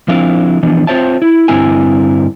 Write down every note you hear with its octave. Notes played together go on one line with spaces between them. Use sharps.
F3 C4 D4 E4 A#4 F5
E3 F3 B3 D4
C4 F4 C5 C#5 E5 A5
E4
G2 D3 C4 E4 A#4 G#5